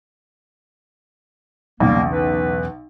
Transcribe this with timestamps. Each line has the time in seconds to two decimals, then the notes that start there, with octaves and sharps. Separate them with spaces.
1.80 B1 E2 C#3 G3 A#3
2.12 B4